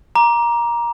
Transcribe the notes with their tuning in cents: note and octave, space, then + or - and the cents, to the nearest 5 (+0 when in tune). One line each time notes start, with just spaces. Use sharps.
A#5 +20 D6 +0